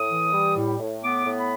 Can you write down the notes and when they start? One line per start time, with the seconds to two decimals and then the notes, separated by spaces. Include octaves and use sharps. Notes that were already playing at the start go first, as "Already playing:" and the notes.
Already playing: A2 D#6
0.08 E3
0.32 G3
0.56 A2
0.79 A2
1.03 B3 D6
1.25 A2
1.37 B5